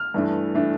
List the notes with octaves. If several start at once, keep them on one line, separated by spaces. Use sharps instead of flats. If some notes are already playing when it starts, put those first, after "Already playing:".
Already playing: F6
G2 E3 A3 D4
E3 A3 D4